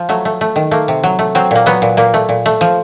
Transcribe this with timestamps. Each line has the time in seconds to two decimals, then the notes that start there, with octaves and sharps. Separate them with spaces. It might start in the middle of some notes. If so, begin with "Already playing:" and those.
Already playing: F3
0.09 F#3 A3
0.25 A3
0.41 A3
0.56 D#3
0.71 A3 A#3
0.88 C3
1.03 F#3
1.19 A3
1.35 F#3 C4
1.51 A#2 A#3
1.66 F#3 B3
1.82 A#2
1.97 A#2 A#3
2.14 A3
2.29 A#2
2.46 A3
2.61 F3